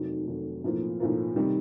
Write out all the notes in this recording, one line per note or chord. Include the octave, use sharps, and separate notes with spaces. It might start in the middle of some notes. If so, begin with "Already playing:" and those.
Already playing: F1 D#2 D#3 F#3 A3
F1 D#2 D#3 F#3 A3
B1 A2 F3 A#3
B1 A2 F3 A#3
C3 D#3 G3